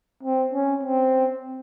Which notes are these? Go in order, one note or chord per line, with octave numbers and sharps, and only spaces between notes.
C4
C#4
C4